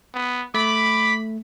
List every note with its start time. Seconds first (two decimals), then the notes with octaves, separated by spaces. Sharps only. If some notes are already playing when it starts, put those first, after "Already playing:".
0.14 B3
0.54 A3 B5 D6